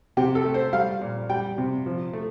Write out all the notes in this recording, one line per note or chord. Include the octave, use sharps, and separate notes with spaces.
C3 G4
A4
A3
C5
G3 F5
A#2
G3 G5
C3
F3
A3